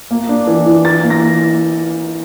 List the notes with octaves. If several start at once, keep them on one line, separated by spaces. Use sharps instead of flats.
A#3
D4
E3
E3
E3 A6
A#3
A#6
E3